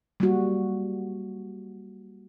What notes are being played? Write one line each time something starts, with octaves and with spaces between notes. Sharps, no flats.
G3 A#3 F#4